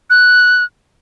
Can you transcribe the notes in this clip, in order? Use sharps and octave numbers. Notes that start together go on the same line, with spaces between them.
F#6